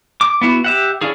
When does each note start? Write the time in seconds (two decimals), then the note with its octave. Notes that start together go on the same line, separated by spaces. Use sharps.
0.21 D6
0.41 B3 E4 F#4
0.64 G4 E5 F#5
1.01 C#4 D4 E4 F4 G#4